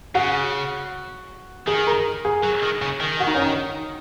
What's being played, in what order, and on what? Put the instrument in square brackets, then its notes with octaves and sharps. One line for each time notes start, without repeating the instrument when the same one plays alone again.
[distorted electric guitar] C#3 [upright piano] F#4
[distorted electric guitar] D#3 [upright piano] G#4
[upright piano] A#4
G#4
[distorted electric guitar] F#3
D#3
C#3
D#3
[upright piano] F#4
D#4
C#4
D#4